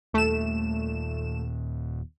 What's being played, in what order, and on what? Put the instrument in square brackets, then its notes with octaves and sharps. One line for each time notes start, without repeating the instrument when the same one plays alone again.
[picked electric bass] D#1 D#2 A#2 [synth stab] A3 E7